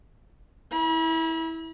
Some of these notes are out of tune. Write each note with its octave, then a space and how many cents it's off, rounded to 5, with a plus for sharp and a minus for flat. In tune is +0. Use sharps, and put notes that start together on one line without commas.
E4 -20 B5 -40